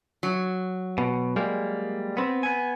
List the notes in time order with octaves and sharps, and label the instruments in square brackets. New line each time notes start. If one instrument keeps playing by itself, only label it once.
[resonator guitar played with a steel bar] F#3
[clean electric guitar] B2
G3 G#3 A#3
B3 C4
B3 G#5